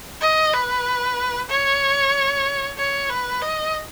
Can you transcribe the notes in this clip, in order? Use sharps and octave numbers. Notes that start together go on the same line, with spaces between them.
D#5
B4
C#5
C#5
B4
D#5